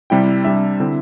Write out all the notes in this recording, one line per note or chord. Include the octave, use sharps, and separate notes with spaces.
C3 G3 E4 G5
C3 G3 D4 E5
D3 C4 E4